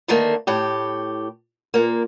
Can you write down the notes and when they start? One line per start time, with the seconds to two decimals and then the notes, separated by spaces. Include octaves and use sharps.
0.08 D3 D#3 A3 A#3
0.47 A2 G4
1.74 A#2 A#3